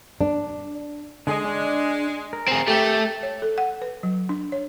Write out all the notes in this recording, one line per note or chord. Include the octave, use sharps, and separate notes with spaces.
D4
D3 G#3 G#4 D#5
D4
A#4
C4 G#4
A3 G4
C#5
A4
F#5
B4
F#3
D4
C#5